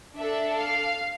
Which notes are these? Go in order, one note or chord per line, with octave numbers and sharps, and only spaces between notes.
D4 A4 E5
F5